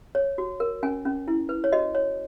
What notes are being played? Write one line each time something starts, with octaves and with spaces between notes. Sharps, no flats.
C#5
F#4
A#4
C#4 G#5
C#4
E4
B4
C#5
F#4 D#5
C#5